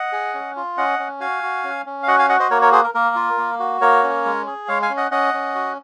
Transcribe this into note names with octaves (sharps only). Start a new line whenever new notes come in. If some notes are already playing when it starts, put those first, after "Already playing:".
Already playing: D#5 F#5
G#4
C#4
F4
C#4 D#5 F#5
C#4
F#4 F5 G#5
F#4
C#4
C#4
F5
F#4 D#5 F#5
F5 G#5
F#4 D#5 F#5
C5 D#5
A#3 A#4 C#5
A#4 C#5
G#4 C5
A#4
A#3 A#4
F4
A#3
F#4
A#3 A#4 C#5
C#4
G#3
G#4
G#3 C#5 F5
F5 G#5
C#4
D#5 F#5
C#4 D#5 F#5
C#4
F#4